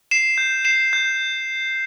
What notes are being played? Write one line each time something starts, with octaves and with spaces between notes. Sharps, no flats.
C7 E7
G6
C7 E7
G6